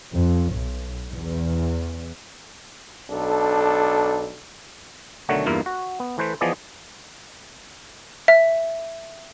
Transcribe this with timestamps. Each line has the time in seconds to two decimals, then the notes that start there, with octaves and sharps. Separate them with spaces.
0.13 F2
0.52 B1
1.10 E2
3.11 B1 D4 A4
5.29 B1 D3 D#3 F#3 A3 F#4
5.46 E2 G2 A#3 E4 F4
5.66 F#4
6.00 B3
6.18 E3 A3 B4 C5
6.41 E3 F3 B3 G#4 D5 D#5
8.28 E5